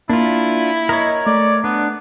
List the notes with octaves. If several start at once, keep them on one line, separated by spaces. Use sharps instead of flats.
A#3 D4 E4 F4
A#4 C#5 D#5
A3 D5
B3 D4